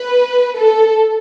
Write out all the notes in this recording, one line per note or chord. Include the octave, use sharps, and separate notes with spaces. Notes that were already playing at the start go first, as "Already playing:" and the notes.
Already playing: B4
A4